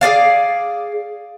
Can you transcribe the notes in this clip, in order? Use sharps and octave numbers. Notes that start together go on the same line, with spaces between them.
G#4 A4 D5 F5